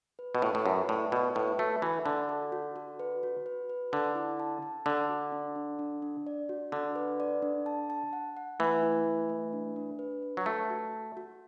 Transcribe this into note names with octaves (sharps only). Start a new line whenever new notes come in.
B4
B2
A2 B4
A2
F#2 B4
A2 D5
B2 F#4
A2 B4
A3 F#4
E3 F#4
D3 A5
A4
F#4
F#4
B4
F#4
B4
B4
D3 A5
E4
A5
A5
D3 D5
F#4
D4
D4
D4
D4
D5
F#4
D3 D4
B4
D5
D4
A5
A5
F#5
F#5
E3 A3
E4
A3
A3
D4
D4
B4
B4
F#3
A3 A4
F#4
F#4
F#4